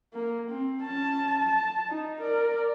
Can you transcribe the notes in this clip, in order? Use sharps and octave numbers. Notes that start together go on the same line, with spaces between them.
A#3
C4
C#4 A5
A5
D#4
A#4 D5